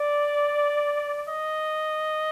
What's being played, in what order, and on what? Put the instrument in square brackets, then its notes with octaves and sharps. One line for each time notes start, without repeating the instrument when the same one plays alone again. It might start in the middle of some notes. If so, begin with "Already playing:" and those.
Already playing: [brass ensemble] D5
D#5